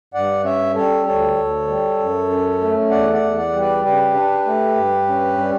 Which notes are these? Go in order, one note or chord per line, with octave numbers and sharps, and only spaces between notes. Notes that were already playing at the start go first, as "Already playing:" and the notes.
G2 D5 F#5
C#4 C#5 E5
G3 A4 C#5
D2 A4 C#5
D2
G3
F#2
C#4
A3
E2 D5 F#5
D5 F#5
E2
D5 F#5
G3
B4 D5
C#3 G4 B4
D4
A3
G2
C#4
G3